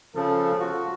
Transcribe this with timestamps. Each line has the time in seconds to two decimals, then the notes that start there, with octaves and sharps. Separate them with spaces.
0.15 C#3 F3 A4
0.60 F4 F#4